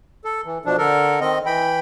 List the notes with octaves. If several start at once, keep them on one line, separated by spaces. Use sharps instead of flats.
A4
E3
B2 F3 D4
D3 A4 A#4
D#3 C4 D#5
E3 G5 B5